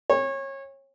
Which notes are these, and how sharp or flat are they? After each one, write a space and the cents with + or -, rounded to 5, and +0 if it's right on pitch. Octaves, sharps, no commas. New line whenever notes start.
C#5 -25 G5 +45